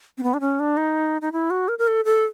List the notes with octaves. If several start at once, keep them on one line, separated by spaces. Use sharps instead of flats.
C4
B3
D4
C#4
D4
D#4
D#4
E4
F#4
A#4
A#4
A4
A4